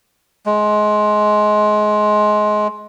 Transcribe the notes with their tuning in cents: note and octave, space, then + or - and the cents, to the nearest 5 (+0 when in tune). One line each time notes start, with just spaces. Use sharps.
G#3 +20